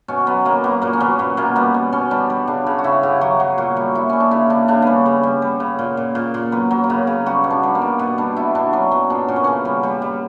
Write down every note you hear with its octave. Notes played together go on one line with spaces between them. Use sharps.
B2 C#4
F#3 B3
F#3 A#3
F#3 B3
A#2 A#3
C#4
F#3 B3
A#2 B3
B2 A#3
G3 B3
G3
B2 C#4
G3 D4
G3
C#3 D4
C#3
F#4
C#3 E4
C#3 G4
F#3 F#4
F#3 F#4
A#2 F#4
G3
A#2 E4
G3 C#4
D4
C#3 E4
C#3 D4
C#3 D4
G3 B3 C#4
C#3
G3
G3
C#3
A#2
A#2
A#2
A#2
F#3 B3
F#3
A#3
C#3 B3
C#3
G3 F#4
B2
D4
G3
A#3
B2
B2 B3
G3 D4
B2 E4
B2 D4
F#3 C#4
F#3 B3
A#2 D4
A#2 C#4
B3
C#3 C#4
G3
G3
G3